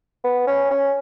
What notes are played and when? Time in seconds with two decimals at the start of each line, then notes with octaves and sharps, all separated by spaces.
0.24 B3
0.47 C#4
0.71 C#4